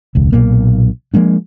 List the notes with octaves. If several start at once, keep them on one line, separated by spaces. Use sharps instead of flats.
E1 C#2
B1 A#2 A#3
F3 G#3 A#3 D4